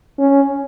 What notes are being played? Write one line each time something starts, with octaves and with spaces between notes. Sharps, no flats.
C#4